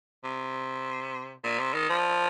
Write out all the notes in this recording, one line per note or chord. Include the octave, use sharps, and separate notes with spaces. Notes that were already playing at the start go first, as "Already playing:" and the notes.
C3
A#2
C3
D#3
F3